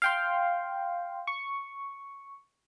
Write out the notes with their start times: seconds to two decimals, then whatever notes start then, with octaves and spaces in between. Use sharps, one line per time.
0.02 F5 G5 C6
1.27 C#6